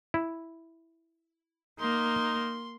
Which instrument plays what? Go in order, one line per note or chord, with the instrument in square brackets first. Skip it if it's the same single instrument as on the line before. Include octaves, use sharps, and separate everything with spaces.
[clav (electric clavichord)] E4
[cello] A#3 [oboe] D#4 [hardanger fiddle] C6